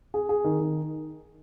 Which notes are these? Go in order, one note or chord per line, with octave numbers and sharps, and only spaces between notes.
G#4
G#4
D#3
D#3